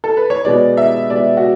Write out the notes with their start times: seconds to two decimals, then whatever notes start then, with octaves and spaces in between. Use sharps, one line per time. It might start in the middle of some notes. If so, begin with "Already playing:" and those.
0.04 A4
0.17 B4
0.30 C#5
0.45 B2 G#3 B3 D5
0.77 E5
1.10 B2 G#3 B3 D5
1.37 F#4